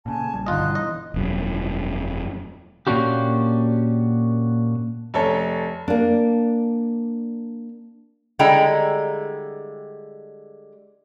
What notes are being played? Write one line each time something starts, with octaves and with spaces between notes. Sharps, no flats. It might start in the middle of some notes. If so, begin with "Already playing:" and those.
A#2 C#3 G#5 A5
A#1 G3
G1 D#4 F4 D#5 C6 F#6
B2 E3
D#5
E1 F#2
A#2 A#3 C#4 D4 F#4 G4
F1 A4 C#5
A#3 D4
D3 G3 G#3 E4 G5 A#5